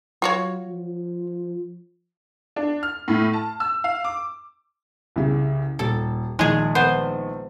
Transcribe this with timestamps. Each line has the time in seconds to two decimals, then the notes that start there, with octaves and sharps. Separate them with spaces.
0.22 F#3 F4 F#4 C#5
0.68 F3
2.56 D4
2.83 F6
3.08 A2
3.33 A5
3.60 E6
3.84 F5
4.05 D6
5.16 C2 C#3
5.79 D#1 A4
6.39 A#1 D#3 G#3 G#4
6.75 B3 C5